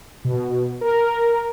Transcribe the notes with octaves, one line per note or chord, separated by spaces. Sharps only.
B2
A#4